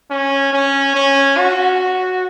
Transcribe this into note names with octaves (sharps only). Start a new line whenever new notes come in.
C#4
C#4
C#4
F#4